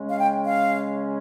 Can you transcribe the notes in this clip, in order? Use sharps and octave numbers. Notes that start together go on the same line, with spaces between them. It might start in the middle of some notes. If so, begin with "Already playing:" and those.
Already playing: C#3 G#3 C#4
F5
G5
F5